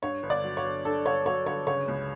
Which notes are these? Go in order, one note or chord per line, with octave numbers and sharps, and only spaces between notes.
G2 C#5
G1
D5
F#3
C#5
G1
G2 A4
G1 C#5
F#3 C#5
G1 C#5
C#3 C#5
C#2